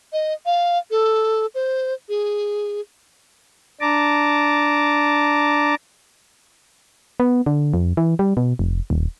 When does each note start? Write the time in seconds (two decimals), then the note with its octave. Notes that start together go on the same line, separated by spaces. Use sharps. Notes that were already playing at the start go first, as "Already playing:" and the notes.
0.13 D#5
0.46 F5
0.91 A4
1.55 C5
2.09 G#4
3.81 D4 A5 A#5 D6
7.20 B3
7.46 D3
7.74 F2
7.97 E3
8.19 G3
8.37 B2
8.59 F1
8.90 D#1